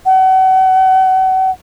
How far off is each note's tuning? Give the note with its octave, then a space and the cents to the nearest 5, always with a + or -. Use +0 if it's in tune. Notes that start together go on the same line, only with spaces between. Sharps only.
F#5 +35